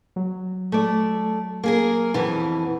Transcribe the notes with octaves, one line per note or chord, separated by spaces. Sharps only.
F#3
A3 D5
A#3 G#4 A#4
F2 B2 E3